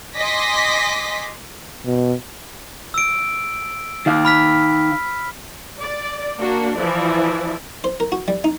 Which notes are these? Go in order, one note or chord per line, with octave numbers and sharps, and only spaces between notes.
D#5 G#5 C6 D6 A#6 B6
B2
E6 D7
D#3 F5
B5 F6 B6
D5
A#3 D4 F#4
E3 F3 E4 D5
C5
A#4
F#4
G3
D#4